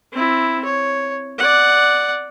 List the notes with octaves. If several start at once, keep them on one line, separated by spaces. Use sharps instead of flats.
C4 E4
C#5
D5 F#5